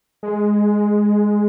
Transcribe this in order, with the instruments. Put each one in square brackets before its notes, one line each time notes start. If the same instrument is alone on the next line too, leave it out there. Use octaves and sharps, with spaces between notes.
[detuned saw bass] G#3